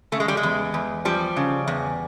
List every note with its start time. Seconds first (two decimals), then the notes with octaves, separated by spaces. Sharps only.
0.12 C#3 A3
0.20 G#3
0.28 G3
0.37 G#3
0.43 E2
0.74 E2
1.05 F3 G3
1.36 C#3
1.67 E2